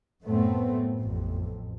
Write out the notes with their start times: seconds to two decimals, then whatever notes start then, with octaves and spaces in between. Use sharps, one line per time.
0.23 F#2 A2 A3 B3 C4
1.00 A1 F2